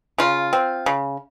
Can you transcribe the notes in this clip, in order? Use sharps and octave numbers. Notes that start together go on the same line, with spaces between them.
C#3 F4
C4
C#3